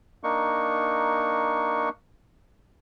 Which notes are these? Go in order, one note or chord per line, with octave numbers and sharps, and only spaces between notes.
A#3 D4 D#4 C#6